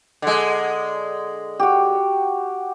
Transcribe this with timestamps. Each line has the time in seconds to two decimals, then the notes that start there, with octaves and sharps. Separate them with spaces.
0.22 D3 G#3
1.60 F#4 G4